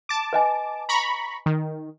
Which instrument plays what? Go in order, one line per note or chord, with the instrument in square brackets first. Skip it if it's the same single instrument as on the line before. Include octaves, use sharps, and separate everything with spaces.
[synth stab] A5 D6
[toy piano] B4 D#5 G#5
[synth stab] A#5 B5 C#6
D#3